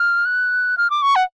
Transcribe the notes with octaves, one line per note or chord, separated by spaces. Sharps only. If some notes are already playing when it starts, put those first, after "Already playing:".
Already playing: F6
F#6
F6
D6
C#6
F#5